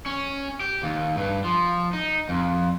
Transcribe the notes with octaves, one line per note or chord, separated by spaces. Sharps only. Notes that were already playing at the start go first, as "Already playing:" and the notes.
C#4
G4
D#2
G2
F3
D#4
F2